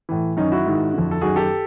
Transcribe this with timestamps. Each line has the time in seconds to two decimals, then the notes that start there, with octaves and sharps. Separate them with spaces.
0.09 A2 E3
0.37 F#2 D#3 C#4 D#4
0.52 E4 F#4
0.66 G#2 D#3
0.93 F2 D3
1.11 A4
1.21 F#2 D#3 F#4 G#4
1.36 G4 A4